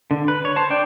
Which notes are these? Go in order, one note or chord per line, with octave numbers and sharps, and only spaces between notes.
D3
B4
C#5
C5 A5
D4 D5 G5